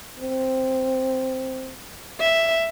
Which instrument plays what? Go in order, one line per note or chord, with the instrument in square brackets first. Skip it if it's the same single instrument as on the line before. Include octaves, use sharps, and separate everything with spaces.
[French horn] C4
[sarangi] E5